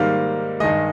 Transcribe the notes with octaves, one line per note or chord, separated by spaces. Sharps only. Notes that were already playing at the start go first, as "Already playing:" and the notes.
Already playing: G#2 D#3 G3 A#3 F5
G2 D#3 G#3 D#5